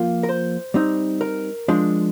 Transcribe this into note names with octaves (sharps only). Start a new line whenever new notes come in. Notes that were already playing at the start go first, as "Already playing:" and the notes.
Already playing: F3 A#3 F4
A#4
C5
G3 C4 D#4
A#4
F3 G#3 D4